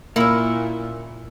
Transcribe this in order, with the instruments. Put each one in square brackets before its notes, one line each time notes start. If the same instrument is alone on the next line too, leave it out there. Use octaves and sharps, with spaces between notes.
[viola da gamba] A#2 [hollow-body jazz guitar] A#3 [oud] C#4 E4